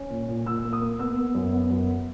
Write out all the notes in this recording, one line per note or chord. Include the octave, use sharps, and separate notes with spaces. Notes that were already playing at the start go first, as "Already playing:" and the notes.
Already playing: C#4
A#2
A#2
A#2 E6
A#3
D#6
A#3
B3 E6
B3
F#2
B3
F#2